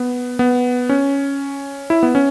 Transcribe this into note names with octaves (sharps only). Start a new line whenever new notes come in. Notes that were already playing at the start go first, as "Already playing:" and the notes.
Already playing: B3
B3
C#4
E4
B3
C#4